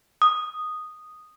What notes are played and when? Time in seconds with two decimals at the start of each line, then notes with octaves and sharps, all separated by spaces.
0.22 D#6